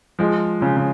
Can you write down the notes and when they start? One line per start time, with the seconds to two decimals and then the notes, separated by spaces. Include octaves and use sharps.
0.19 F3 G#3
0.61 C#3 F3
0.77 C#3